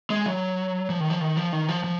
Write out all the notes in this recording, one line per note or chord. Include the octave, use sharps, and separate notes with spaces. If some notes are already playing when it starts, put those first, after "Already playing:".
G#3
F#3
F3
D#3
F3
D#3
F3
D#3
F3
F3